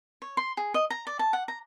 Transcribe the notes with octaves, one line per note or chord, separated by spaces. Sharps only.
C#5
C6
G#4
D#5
A#5
D5
A5
F#5
A#5